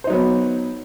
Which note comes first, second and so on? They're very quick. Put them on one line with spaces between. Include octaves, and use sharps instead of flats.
C5 D#4 F#3 B3